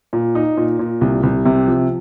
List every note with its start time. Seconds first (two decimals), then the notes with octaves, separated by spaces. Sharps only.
0.13 A#2
0.35 D#4
0.57 A#2
0.79 A#2
1.01 C2
1.23 C2
1.45 C3
1.67 F3